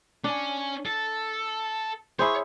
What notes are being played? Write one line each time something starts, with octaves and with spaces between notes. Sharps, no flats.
C#4 D4
A4
E4 G#4 C5 C#5